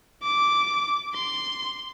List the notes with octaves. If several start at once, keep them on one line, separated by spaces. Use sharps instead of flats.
D6
C6